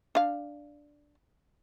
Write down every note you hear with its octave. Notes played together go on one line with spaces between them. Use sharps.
D4 F5